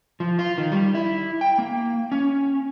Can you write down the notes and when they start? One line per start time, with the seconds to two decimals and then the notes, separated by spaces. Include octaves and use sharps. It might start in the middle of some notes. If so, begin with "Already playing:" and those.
0.20 F3
0.39 F4
0.58 D#3
0.72 G3
0.95 E4
1.41 G5
1.58 A#3
2.12 C#4